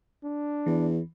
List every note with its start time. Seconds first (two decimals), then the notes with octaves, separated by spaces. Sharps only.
0.24 D4
0.66 E2 E3